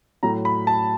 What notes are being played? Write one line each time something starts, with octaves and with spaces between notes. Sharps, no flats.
A2 F#3 A#5
B5
A5